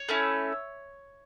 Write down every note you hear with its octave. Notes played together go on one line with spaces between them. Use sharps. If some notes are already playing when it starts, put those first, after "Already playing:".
Already playing: C#5
A3 C#4 E4